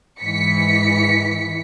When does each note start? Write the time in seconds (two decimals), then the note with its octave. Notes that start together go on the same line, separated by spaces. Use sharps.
0.20 G#2 E3 B6 C#7